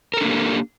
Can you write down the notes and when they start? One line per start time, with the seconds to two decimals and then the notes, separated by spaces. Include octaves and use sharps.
0.14 A#4
0.17 A4
0.21 D4
0.24 A#3
0.28 G4